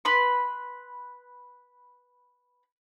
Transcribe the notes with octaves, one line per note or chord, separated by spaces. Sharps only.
B4 B5 C6